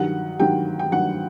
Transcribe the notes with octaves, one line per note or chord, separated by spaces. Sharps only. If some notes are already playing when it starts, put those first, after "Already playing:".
Already playing: G2 D#3 F#3 F#5
G2 D#3 F#3 G5
G5
G2 D#3 F#3 F#5